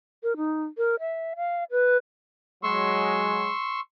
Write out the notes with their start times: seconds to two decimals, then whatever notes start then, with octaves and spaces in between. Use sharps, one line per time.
0.23 A#4
0.37 D#4
0.78 A#4
1.00 E5
1.36 F5
1.71 B4
2.63 F#3 G#3 C6 C#6 E6